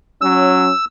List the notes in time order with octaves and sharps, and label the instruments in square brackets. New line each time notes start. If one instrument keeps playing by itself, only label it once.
[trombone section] F#3 C#4 [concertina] E6